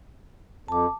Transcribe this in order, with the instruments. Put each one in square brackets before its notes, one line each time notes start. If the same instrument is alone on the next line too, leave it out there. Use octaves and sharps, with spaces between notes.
[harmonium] F2 [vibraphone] A5 D6